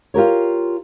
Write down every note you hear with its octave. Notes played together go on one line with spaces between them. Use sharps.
F4 G4 A#4 C#5